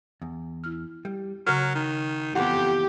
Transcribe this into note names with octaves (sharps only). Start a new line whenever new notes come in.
E2
E4 F6
G3
C#3 F#3 A#4 F6
D#3
F2 E3 B3 G4 F#5